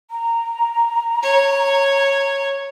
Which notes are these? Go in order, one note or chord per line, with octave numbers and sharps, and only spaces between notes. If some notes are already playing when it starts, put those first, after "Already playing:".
A#5
C#5